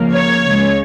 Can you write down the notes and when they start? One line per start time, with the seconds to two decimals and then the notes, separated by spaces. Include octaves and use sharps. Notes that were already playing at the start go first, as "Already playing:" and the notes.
Already playing: C#2 C#3 F3 A#3
0.13 C#5
0.44 C#2 C#3 G#3